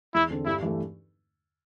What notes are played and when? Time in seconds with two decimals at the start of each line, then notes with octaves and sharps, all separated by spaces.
0.14 E2 E4
0.30 D3 C4 A4
0.46 G2 E4
0.62 E3 A3